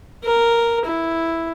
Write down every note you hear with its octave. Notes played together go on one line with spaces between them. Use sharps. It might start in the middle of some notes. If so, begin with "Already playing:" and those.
A#4
E4